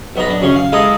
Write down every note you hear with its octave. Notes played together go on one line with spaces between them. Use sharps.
B1 B3 D#4 A#5 B5
D4
F#2 C#3 C#4
F5
G#3 E4 A4 F5 A#5 D#6